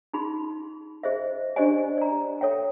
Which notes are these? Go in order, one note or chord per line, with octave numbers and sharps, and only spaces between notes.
D#4 F4 G#4 B5 C6
G#4 C5 D#5 E5
D4 G4 C5 D5 D#5 G#5
D5 A#5
A4 C#5 E5 G5